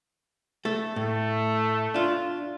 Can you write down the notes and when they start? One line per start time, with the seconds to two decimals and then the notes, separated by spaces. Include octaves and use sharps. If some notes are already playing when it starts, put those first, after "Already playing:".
0.65 A3 A4
0.96 A2 A3
1.94 D4 F4